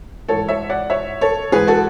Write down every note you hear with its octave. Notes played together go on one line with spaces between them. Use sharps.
G#2 E3 A4 C#5
C#5 E5
D5 F#5
C#5 E5
A4 C#5
G#2 E3 G#4 B4
F#4 A4